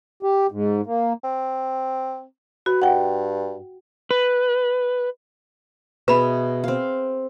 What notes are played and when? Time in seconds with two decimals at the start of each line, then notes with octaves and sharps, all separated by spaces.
0.23 G4
0.51 G#2
0.86 A#3
1.24 C4
2.66 F#4 B4
2.82 G2 F#5 G5
4.11 B4
6.08 B2 G#4 B4 E5 B5
6.64 C4 F5